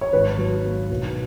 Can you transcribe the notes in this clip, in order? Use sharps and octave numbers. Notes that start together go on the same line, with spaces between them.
C#5
G#1 B4
F#3
A#3
B1